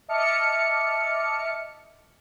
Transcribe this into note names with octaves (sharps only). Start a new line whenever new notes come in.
D#5 E5 A5 D6 F6 C#7